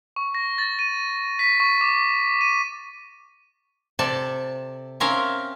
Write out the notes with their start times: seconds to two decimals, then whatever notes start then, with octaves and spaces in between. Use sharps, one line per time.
0.16 C#6
0.35 A#6
0.58 A6
0.79 D#7
1.39 B6
1.60 C#6
1.81 D6
2.41 D#7
3.99 C3 A4 D5 A5
5.00 C4 C#4 A#4 E5 F5